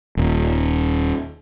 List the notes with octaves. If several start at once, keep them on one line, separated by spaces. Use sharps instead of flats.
D#1